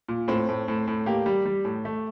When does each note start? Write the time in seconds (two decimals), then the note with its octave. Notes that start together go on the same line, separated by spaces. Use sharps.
0.08 A#2
0.28 A2 C4
0.49 A2
0.68 A2
0.88 A2
1.06 A#3 G4
1.26 G3
1.45 G3
1.65 A2
1.85 A3